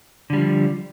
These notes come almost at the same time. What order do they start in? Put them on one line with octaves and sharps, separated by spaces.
D3 G3 F3